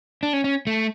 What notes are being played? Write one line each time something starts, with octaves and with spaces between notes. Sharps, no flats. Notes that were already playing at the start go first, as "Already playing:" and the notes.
D4
C#4
C#4
A3